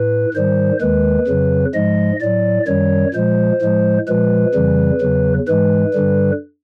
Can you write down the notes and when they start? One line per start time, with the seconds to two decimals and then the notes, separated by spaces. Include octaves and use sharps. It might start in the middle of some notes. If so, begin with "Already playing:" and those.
Already playing: A2 B4
0.34 G#2 D#3 G3 C5
0.81 D#2 D#3 G#3 B4
1.27 F2 C#3 F#3
1.74 G#2 F3 G#3 D#5
2.21 A2 F#3 D5
2.67 F#2 D#3 G3 C#5
3.14 A#2 F3 G#3 C5
3.62 A2 F3 G#3
4.08 A#2 F3 G#3 B4
4.54 F2 C#3 E3 G3
5.01 E2 C#3 F#3
5.48 G#2 E3 G#3 B4
5.94 G2 D3 G3